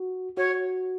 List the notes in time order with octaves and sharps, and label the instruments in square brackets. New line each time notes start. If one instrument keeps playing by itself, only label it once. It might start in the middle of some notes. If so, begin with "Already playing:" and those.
Already playing: [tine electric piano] F#4
[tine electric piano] F#4 [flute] C#5